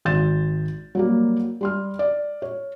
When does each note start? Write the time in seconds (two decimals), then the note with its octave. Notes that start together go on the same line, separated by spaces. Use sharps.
0.05 G#1 C6 G6 A6 E7
0.95 F#3 G3 A#3
1.61 G3 C6 F6
1.99 D5
2.42 C#5